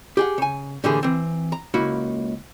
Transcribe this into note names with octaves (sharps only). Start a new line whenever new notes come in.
G4 G#4 F#5
C#3 G#5
A2 D3 E3 A#3 G4 G#4
E3 C4
A#5
C#2 A#3 E4 F#4